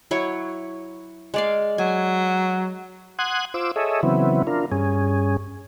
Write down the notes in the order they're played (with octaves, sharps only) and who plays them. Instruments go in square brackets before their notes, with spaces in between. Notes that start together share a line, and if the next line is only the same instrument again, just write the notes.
[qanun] F#3 E4 C#5
G#3 D5 F5
[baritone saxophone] F#3 [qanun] G#5
[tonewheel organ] F#5 C6 D#6 F#6 G#6
F4 C5 D6 E6
G#4 A4 C#5 D#5 E5
C#3 E3 F#3 B3 C4 E4
D4 F4 A#4
G2 C#4 G#4